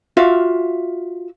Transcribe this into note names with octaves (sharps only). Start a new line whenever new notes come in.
F4 F#4 E5 F5